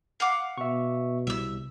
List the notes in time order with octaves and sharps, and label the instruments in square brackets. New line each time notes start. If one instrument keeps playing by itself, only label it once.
[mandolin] F5 F#5 D6
[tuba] B2 [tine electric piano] E5 C#6
[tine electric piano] C2 [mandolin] E5 E6